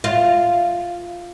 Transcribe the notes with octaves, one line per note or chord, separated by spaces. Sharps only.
F4